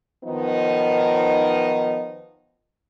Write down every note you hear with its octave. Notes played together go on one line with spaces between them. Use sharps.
D#3 F3 B3 D#4